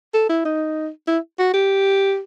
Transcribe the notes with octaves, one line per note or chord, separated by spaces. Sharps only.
A4
E4
D#4
E4
F#4
G4